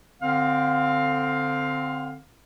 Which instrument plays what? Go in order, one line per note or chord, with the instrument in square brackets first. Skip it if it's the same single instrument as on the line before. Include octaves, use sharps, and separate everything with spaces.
[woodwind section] D3 C4 F5